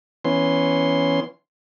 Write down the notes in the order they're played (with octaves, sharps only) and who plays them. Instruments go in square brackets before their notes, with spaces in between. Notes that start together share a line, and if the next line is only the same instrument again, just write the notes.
[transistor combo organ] E3 B3 C#4 C6